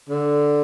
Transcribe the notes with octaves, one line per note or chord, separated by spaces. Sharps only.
D3